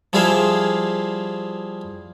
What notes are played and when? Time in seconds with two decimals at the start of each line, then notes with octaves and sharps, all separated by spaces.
0.13 F3 G3 E4 G#4 F5